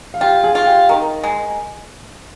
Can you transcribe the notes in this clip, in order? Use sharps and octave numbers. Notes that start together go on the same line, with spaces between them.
F5
F4 G4 G5
G#4 G#5
F4
G4 G5
D#3 A#4 A#5
G#3